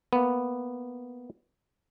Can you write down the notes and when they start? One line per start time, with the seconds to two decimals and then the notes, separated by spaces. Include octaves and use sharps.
0.13 A#3 B3